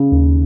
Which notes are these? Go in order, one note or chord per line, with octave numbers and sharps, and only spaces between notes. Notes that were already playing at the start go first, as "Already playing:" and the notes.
Already playing: C#3
D#2